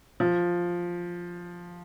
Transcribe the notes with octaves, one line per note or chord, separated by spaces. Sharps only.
F3